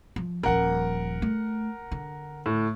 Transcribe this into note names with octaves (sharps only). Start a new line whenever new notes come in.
F3
D#1 F3 A#4 F#5
A3
D3
A2